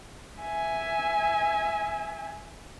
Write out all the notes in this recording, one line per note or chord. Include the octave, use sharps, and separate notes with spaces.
E5 G#5